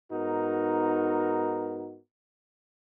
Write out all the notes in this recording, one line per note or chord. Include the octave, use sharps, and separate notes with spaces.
G#2 B3 D#4 F#4 A#4